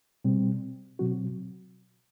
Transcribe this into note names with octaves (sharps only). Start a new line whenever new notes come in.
B2 G3 C4
B2 F#3 C4 F#4